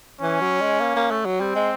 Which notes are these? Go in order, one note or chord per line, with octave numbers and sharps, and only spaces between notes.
E3 C#4
F#3
G#3
A#3
A#3
A3
F#3
G3 C4
G#3